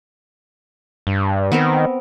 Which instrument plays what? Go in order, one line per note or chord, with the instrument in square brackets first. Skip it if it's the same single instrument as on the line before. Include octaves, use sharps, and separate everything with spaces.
[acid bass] G2
[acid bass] D#3 [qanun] B3 C4 A#4